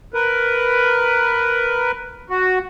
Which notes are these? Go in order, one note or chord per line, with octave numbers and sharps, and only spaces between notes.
A#4 B4
F#4